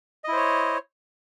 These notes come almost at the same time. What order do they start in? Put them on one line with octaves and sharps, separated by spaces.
D#5 E4 C5 C#5